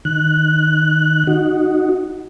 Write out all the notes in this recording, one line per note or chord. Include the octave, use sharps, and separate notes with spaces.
D#3 F#6
D#4 F#4